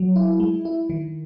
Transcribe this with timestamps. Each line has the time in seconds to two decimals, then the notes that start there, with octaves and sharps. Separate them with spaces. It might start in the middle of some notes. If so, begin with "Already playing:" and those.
Already playing: F#3
0.16 E4
0.40 G#3
0.65 E4
0.90 D#3